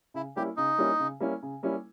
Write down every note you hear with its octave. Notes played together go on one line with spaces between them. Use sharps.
C#3 E4
G3 A#3 C#4 E4 G4
C#3 D#4
G3 A#3 C#4 E4
C#3
G3 A#3 C#4 E4
C#3
G3 A#3 C#4 E4